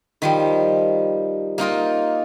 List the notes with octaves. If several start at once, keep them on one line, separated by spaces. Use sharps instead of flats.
D#3 F3 G3
A#3 D#4 F4 A#4